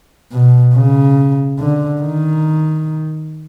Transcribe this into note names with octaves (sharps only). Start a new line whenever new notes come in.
B2
C#3
D3
D#3